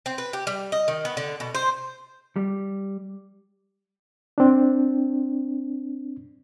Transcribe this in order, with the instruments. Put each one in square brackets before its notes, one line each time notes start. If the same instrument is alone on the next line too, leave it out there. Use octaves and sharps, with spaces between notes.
[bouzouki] C4
B4
G4
G3
D#5
D#3
B3
D3
B2
C5
[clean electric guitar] G3
[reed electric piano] C4 D4